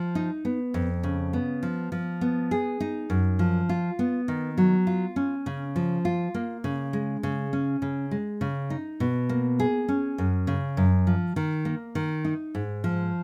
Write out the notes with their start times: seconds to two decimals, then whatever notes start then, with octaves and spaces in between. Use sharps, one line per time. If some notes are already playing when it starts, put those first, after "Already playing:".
Already playing: F3
0.15 D#4
0.45 B3
0.74 F2
1.03 C#3
1.33 B3
1.63 F3
1.92 F3
2.21 B3
2.51 G#4
2.80 D#4
3.10 F#2
3.39 F3
3.69 F4
3.99 B3
4.28 D#3
4.57 F#3
4.87 F4
5.16 C#4
5.46 C#3
5.76 F3
6.05 F4
6.34 A#3
6.64 C#3
6.93 G#3
7.23 C#3
7.53 C#4
7.82 C#3
8.11 G#3
8.41 C#3
8.70 D#4
9.00 B2
9.29 A#3
9.60 G#4
9.88 C#4
10.18 F#2
10.47 C#3
10.77 F#2
11.07 F3
11.36 D#3
11.65 A#3
11.95 D#3
12.25 D#4
12.55 G#2
12.84 F3